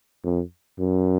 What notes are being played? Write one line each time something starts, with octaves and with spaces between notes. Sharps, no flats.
F2
F#2